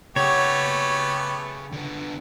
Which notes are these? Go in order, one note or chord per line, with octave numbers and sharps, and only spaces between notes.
C#3 A3 B3 G4 C#5 F#5
D3 B3